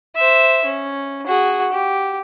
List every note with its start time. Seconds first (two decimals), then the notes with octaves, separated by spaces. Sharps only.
0.16 C5 E5
0.65 C#4
1.27 F#4 G#4
1.72 G4